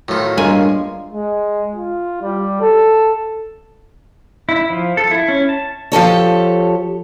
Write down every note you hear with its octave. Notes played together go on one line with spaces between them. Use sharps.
A2 D#3 F#3 B3 F4
G2 G#3 A#3 F4 G#5
G#3
F4
G3
A4
E4
F3
A4
E4
C#4
A5
F3 G4 A4 C#5